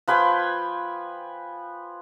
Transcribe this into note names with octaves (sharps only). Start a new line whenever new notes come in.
F3 B4 G5 G#5